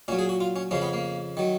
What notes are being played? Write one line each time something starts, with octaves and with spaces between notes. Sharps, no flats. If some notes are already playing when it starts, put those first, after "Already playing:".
A#2 F#3 C#4
G#4
F#4
F4
C#4
F2 C#3 F3 C#4
B3
A#3
D#3 F#3